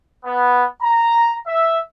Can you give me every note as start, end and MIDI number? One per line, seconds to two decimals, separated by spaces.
0.25 0.65 59
0.81 1.35 82
1.47 1.78 76